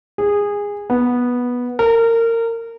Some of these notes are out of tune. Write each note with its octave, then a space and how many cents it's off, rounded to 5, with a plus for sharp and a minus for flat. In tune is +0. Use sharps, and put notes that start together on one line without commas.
G#4 -20
B3 -10
A#4 -25